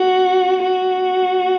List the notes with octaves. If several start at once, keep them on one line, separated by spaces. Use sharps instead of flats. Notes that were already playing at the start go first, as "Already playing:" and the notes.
Already playing: F#4
F#4